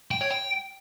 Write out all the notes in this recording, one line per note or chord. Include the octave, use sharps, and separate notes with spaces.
G5
C#5
G5